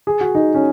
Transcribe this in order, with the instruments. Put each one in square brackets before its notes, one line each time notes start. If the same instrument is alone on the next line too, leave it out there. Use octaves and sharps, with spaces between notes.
[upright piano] G#4
F#4
D#4
C#4